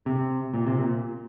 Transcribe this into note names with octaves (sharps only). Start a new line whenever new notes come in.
C3
A#2
C3
A#2